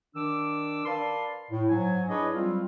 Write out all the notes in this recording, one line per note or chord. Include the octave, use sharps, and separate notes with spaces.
D#3 D4 D6 E6
A#4 B4 D5 F5 A5 C6
A2
G#2 F#3 G#5
D4 E4 G#4 B4 C#5 D#5
F#3 G3 C4 F4